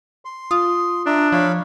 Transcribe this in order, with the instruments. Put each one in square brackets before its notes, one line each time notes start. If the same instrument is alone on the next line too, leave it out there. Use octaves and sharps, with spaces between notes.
[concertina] C6
[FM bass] F4 [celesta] D#6
[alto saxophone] D4 [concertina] E5 A#5
[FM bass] F3 [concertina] C#5 F5 B5